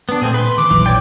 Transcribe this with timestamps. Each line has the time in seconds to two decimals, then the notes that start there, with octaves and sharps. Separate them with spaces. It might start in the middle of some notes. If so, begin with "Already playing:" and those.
0.09 B3 D4
0.21 A#2 A3 C4 G#4
0.34 B4 C6
0.58 D#3 D6
0.70 E1 A#1 E3 F#3
0.86 C#5 D5 G5